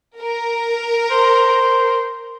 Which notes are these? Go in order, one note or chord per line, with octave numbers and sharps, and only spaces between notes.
A#4
C5